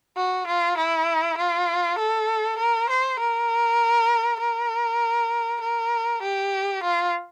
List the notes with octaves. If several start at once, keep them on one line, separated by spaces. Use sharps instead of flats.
F#4
F4
E4
F4
A4
A#4
C5
A#4
A#4
A#4
G4
F4